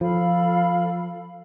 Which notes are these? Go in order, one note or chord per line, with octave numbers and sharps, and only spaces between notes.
F3 A4 F5 B5